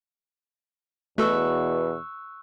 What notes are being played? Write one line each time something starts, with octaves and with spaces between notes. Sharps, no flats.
E2 B2 A3 F#4 A4 C#6 E6 F#6